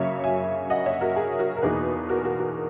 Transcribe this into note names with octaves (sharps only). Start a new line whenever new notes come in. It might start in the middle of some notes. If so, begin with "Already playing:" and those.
Already playing: F#2 C#3 F#3 A#3 C#5 E5
E5 G#5
D#5 F#5
C#5 E5
F#4 A#4
G#4
F#4 A#4
A#4
E2 B2 A#3 D#4 G#4 B4
F#4 A#4
F#4 A#4
F#4